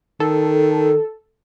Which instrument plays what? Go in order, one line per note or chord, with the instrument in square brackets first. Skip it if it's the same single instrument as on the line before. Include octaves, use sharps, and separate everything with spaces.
[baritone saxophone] D#3 [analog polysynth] A4